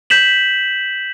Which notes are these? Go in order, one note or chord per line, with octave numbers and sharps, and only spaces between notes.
G6 B6 E7 F#7